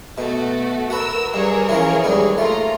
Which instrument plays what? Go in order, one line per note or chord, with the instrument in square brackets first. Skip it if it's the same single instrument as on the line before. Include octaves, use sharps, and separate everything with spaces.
[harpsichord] B2 [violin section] A3 F#4
[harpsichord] F#4 B4 [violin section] A#4 E6
[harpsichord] G2 [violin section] G#4 A#4 C#5
[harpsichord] E3 F3 C#4
D#2 G#2 G3
[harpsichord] A3 [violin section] F4 A#5